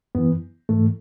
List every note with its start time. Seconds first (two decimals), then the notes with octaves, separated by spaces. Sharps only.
0.15 F#2 E3 B3
0.69 G#2 E3 A3